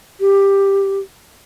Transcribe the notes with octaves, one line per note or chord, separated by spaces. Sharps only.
G4